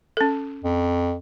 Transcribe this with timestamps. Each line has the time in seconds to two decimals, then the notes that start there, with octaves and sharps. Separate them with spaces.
0.17 C#4 A4
0.64 F2